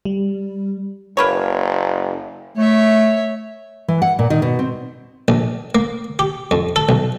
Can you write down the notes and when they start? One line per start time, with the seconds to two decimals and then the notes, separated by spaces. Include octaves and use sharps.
0.05 G3
1.17 F#1 A#3 B4 C#5
2.57 A3 C#5 E5
3.88 E3
4.02 F#5
4.19 A#2
4.30 D#3
4.42 B2
4.59 C4
5.28 A#1
5.75 A#3
6.19 G4
6.51 F2
6.76 A4
6.89 B1